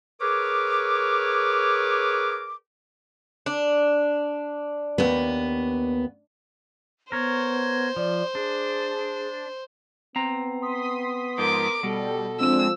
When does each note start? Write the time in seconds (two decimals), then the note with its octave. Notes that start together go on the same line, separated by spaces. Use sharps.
0.21 G#4 A#4 B4 C#5 D6
3.46 D4
4.98 D#2 B3
7.12 B3 A#4 C5 C#5
7.96 F3 D5
8.35 D4 G#4
10.16 B3 C4 A#5
10.62 C6 D#6 B6
11.38 G#2 F3 A#4 D6
11.83 B2 G3 A4
12.40 F3 G#3 C4 D4 E6